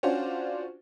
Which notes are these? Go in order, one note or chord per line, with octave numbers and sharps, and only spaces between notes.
C#4 D4 F4 F#4 C5